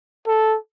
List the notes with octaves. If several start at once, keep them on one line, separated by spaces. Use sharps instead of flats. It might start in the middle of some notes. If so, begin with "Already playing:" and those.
A4